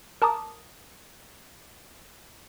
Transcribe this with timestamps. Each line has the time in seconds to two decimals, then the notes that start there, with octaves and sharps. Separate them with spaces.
0.22 A#4 A5 A#5 D6 D#6